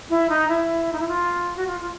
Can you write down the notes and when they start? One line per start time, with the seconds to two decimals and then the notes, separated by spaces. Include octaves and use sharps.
0.10 E4
0.30 D#4
0.49 E4
0.93 D#4
1.00 E4
1.08 F4
1.56 F#4
1.67 F4
1.81 F4